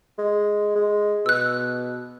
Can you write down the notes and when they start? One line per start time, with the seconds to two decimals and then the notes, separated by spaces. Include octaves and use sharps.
0.18 G#3
0.76 G#3
1.26 B2 E6 F#6